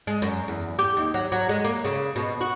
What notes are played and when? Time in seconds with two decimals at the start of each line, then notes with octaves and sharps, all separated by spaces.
0.07 G#3
0.22 F#2
0.48 E2
0.79 G4
0.97 D#2
1.14 F#3
1.32 F#3
1.49 G#3
1.64 A#3
1.85 C#3
2.16 B2
2.41 F#4